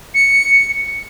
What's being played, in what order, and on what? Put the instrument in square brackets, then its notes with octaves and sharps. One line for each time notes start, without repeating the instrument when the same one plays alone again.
[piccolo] C#7